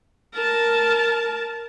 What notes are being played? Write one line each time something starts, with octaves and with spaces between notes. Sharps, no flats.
A#4 A5